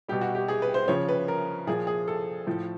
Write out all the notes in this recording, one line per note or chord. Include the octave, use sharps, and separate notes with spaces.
B2 G3 G4
F#4
G4
G#4
B4
C5
C#3 F3 C#5
B4
A#4
A#2 F3 G#4
G#4
A4
A2 F3